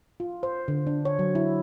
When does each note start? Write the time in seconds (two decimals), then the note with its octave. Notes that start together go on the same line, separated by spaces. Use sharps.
0.20 F4
0.43 C5
0.68 D3
0.87 D4
1.05 C#5
1.19 F#3
1.35 E4